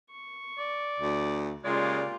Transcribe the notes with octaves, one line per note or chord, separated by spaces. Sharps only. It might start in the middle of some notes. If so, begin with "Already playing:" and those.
C#6
D5
D2
A#2 C#3 G#3 F4 G4 D5